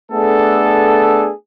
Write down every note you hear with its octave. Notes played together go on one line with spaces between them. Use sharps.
A3 B3 D4 G#4 A4